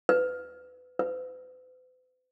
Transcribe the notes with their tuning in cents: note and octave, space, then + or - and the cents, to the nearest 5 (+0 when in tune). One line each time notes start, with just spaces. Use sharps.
B4 +25
B4 +45